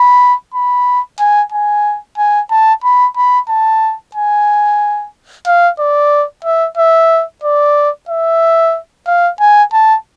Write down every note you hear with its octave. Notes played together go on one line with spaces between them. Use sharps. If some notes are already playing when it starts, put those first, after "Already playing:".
Already playing: B5
B5
G#5
G#5
G#5
A5
B5
B5
A5
G#5
F5
D5
E5
E5
D5
E5
F5
G#5
A5